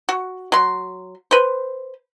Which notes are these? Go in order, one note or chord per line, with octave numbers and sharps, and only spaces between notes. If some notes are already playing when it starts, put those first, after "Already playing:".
F#4
F#3 C6
B4 C5